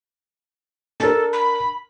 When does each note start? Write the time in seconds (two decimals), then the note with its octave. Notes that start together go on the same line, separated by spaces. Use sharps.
1.00 D4 A4 A#4
1.33 B5